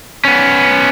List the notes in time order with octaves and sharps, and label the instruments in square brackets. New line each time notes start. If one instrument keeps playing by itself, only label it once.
[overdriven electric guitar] B3 C#4